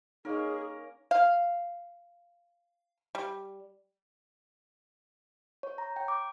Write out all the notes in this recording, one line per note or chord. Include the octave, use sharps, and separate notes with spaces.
A#3 C#4 D#4 G#4 A#4 D#5
F5
G3
C#5
A#5
G5
D6